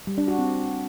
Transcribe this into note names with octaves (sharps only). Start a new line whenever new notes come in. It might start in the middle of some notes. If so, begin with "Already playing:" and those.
G3
D4
F#4
C4